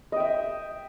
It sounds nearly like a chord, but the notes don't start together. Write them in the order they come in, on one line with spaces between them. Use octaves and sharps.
D#5 G5 E5